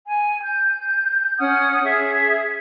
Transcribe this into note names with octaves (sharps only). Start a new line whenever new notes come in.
G#5
G6
C#4 F#5 D#6 F6
G#4 E5